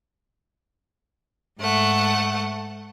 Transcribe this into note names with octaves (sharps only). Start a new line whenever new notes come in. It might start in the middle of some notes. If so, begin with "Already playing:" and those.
G#2 A3 F#5